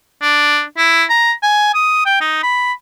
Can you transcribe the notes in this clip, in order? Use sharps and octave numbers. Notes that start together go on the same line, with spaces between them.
D4
E4
A#5
G#5
D#6
G5
D#4
B5